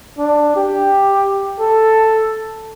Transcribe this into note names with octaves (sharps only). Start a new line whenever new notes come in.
D4
G4
A4